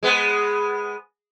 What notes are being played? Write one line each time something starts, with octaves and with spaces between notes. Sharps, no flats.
G#3 B3